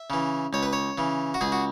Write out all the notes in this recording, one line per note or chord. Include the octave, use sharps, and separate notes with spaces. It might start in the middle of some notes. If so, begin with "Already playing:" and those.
Already playing: E5
C#3 E3
C#2 C#5
B4
C#5
C#3 E3
F#4
C#2 G#4
F#4